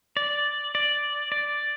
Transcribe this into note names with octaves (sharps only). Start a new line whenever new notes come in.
D5
D5
D5